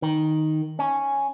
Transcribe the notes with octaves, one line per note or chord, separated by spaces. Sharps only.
D#3
C#4